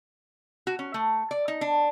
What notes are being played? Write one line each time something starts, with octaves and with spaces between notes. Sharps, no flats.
F#4
C#4
A3
D5
D#4
D4